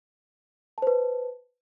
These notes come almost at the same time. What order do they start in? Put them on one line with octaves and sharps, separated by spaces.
A5 C5 B4